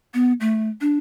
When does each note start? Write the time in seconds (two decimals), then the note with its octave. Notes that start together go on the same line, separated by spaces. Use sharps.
0.14 B3
0.40 A3
0.81 D4